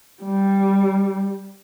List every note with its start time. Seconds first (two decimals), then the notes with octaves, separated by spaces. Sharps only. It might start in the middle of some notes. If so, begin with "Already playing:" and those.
0.22 G3